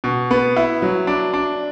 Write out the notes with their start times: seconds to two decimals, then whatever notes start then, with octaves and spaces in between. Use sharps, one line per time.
0.04 B2
0.31 B3
0.56 E4
0.82 F#3
1.07 D4
1.33 D4